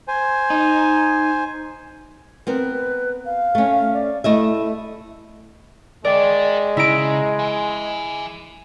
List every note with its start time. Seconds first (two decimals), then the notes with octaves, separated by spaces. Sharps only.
0.08 C5 G#5
0.50 D#4
2.47 B3 C4 A#4 B4
3.25 F5
3.55 A3 C#4
3.94 D5
4.24 A3 E4 D#5 E5
6.05 G#3 A#4 D5 G5
6.77 C#3 E4 A#5 D7
7.39 E5 G#5